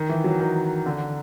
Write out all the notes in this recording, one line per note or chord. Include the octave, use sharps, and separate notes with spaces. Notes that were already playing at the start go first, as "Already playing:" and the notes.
Already playing: D#3
E3
F#3
D#3
D3